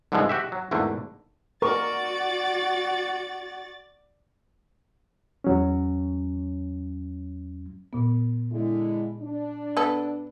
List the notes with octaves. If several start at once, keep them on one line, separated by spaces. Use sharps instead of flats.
C2 G#2 D3 E3 F3 G#3
F#4 G4 E5
F#3
G#1 E2 D3 A3 A#3
F#4 A#4 D5 C#6 A6
E2 F#3 C#4
A#2 B3
D3 G#3 E4
D4
B3 A4